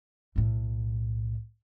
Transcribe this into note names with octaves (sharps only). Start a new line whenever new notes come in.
B1 A2